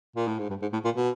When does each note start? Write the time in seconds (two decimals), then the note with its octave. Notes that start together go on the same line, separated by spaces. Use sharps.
0.16 A#2
0.28 A2
0.39 G#2
0.50 G2
0.62 G#2
0.73 A2
0.85 A#2
0.96 B2